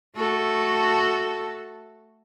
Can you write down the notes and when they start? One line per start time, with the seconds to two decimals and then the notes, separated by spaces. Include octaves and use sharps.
0.16 A3 F#4 A4